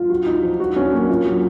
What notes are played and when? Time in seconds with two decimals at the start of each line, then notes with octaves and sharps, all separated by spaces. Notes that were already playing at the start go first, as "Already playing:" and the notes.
Already playing: F4
0.10 F#4
0.26 D#4
0.43 F3
0.60 F#4
0.76 C#4
0.93 A#3
1.09 F4
1.26 F#3